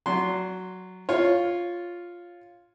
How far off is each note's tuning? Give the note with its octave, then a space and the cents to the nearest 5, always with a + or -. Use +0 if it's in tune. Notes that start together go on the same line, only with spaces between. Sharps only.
F#3 +0 D5 -40 C6 +0
F4 +0 C#5 +0